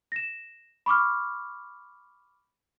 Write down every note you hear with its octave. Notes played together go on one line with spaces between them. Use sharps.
A#6 E7
B5 C#6 D6 F6